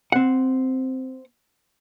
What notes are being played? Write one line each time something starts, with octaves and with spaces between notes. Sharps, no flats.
C4 F#5